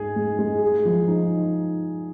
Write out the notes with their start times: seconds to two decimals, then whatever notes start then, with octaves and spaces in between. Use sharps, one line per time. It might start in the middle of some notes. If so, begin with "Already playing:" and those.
Already playing: G#2 G#3 G#4
0.16 G#3
0.39 G#3
0.62 G#4
0.85 F3
1.08 D#4